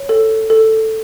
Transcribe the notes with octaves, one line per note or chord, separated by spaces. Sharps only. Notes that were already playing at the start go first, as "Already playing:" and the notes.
Already playing: C#5
A4
A4